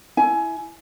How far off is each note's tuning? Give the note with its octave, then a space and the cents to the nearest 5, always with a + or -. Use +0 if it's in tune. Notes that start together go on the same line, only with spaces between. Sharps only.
E4 +0 G#5 +20